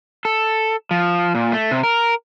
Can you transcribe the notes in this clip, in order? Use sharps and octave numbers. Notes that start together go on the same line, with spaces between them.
A4
F3
A#2
A3
C3
A#4